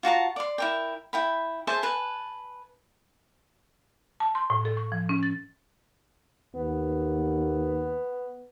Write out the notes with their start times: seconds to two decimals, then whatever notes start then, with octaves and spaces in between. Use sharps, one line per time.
0.03 F4 F#4 A5 A#5
0.36 D5 C6
0.58 E4 A#4 G5
1.13 E4 G5 B5
1.67 G#4 C5 E5 A5
1.83 B4 G#5 A5
4.20 A5
4.35 C6
4.50 A2
4.65 A4
4.77 C#6
4.92 F3
5.09 C#4
5.23 A6
6.56 D#2 B3